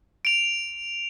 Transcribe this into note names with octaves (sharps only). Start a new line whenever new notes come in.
D7 F7